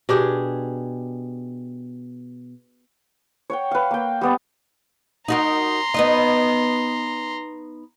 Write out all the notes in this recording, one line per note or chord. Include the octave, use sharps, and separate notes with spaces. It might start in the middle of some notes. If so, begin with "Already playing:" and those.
B2 D4 G4 G#4
C#5 F#5 G5
B4 F5
A#3 G5
G3 B3 D5
D#4 F#4 A#4 A#5 C6
B3 D#4 D#5